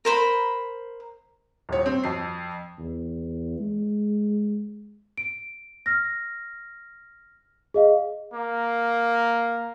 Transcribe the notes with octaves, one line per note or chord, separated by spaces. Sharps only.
A#4 C5 B5
D#1 C#5
C4
F2 C7
E2
G#3
D7
F6 A#6
G#4 D#5 F5
A#3